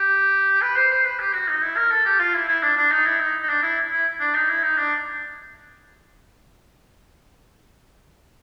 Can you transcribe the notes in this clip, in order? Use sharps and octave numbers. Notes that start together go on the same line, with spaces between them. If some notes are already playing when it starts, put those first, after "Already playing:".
Already playing: G4
B4
C5
C5
B4
G4
F#4
D#4
E4
A#4
A4
G4
F4
E4
E4
D4
D4
D#4
E4
D#4
D#4
D4
E4
E4
D4
D#4
E4
D#4
D4